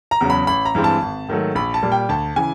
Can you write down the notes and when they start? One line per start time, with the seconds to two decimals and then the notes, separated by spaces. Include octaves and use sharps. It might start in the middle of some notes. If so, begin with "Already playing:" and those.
0.11 A#5
0.21 E2 C#3 F#3
0.30 B5
0.47 A1 B5
0.65 A#5
0.75 G2 E3 G#3 C4
0.84 A5
1.02 G#1
1.29 G#2 D#3 F#3 A3
1.55 A#1 B5
1.74 A5
1.83 A#2 G3
1.92 G5
2.09 D2 A5
2.36 C#3 E3 G#5